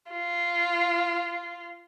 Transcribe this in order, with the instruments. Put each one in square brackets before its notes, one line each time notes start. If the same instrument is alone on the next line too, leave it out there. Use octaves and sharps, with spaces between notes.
[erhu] F4